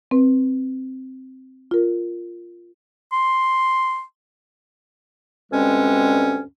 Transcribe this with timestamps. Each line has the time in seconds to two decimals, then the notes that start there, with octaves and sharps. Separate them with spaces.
0.11 C4 B4
1.71 F4 A#4
3.12 C6
5.52 D2 G2 G#3 C4 C#4